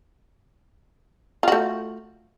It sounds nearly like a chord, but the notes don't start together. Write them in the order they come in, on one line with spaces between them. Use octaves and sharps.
F4 F#4 A3